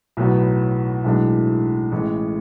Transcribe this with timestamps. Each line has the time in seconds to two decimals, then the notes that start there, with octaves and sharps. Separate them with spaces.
0.17 B1 A2 F#3 B3 F#4
1.04 B1 A2 E3 G#3 D4
1.92 A1 A2 G#3